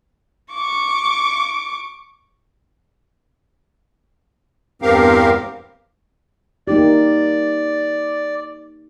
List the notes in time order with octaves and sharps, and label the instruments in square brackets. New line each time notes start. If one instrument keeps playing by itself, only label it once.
[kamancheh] C#6 D6
[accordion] E2 G2 C4 G4 A#4 F5
[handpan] A#3 D#4 G4 [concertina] D5